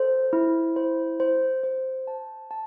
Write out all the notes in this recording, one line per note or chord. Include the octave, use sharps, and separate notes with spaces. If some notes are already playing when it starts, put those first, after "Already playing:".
Already playing: A4 C5
E4
C5
C5
C5
A5
A5